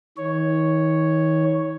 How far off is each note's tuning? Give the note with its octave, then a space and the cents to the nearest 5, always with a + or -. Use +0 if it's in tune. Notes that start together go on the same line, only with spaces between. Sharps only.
D#3 +40 C#5 +0